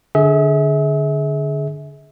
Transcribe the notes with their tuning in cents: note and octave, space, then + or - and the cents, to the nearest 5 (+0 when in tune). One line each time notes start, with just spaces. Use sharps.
D3 +0 G#4 +20 E5 -35